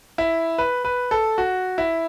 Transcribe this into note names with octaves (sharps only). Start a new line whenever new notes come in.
E4
B4
B4
A4
F#4
E4